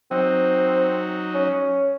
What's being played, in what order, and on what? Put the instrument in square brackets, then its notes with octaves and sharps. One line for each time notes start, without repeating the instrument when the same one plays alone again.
[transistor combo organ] F#3 D#4 [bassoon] C4
[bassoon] C#4